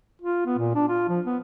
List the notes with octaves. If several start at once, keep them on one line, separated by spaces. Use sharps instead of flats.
F4
B3
A#2
D4
F4
F3
B3